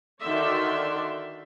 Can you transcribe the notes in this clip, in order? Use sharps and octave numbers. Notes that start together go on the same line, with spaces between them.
D3 D#3 F#4 D5 E5 C6